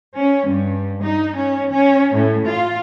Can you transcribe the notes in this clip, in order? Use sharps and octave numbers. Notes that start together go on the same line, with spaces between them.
C#4
G2
D#4
C#4
C#4
A2
F4